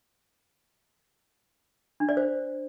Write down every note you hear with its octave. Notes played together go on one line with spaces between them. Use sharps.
D4
D5
C5